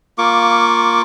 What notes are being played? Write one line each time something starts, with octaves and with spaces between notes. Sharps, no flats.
A#3 F4 C#6 D6